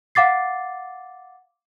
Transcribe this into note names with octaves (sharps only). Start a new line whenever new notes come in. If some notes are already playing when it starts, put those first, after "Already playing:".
F5 F#5 D6 A6 C7